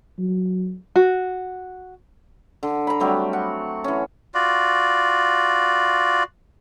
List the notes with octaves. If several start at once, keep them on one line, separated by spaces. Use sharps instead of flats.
F#3
F#4
D3
A#5 B5
F#3 G3 A3 C4
F#5
E3 C#4
F4 F#4 D5